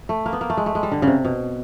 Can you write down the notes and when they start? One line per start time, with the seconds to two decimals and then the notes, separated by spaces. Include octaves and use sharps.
0.09 A3
0.26 A#3
0.33 B3
0.41 A#3
0.50 A3
0.57 G#3
0.66 A3
0.75 G#3
0.83 G3
0.92 D3
1.02 C#3
1.07 C3
1.25 B2